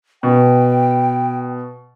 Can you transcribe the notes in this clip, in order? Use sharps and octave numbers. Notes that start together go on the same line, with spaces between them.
B2 G5